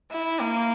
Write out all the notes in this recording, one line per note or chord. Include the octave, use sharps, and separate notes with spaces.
E4
A#3